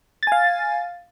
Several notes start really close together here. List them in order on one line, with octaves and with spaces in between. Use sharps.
A6 G#5 F5